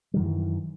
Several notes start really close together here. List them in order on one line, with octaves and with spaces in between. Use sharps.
G3 D#3 F#2 E3